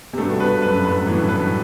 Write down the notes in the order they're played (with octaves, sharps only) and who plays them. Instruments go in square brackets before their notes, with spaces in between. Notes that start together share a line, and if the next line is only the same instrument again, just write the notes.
[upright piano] C3
[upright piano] G2 B2 [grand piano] A3
[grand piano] B4
[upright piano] F#2 [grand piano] B4
[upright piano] G2
[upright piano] F#2 A2 [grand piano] B4
[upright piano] A2 [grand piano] E3
[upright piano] G2 B2
[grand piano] B4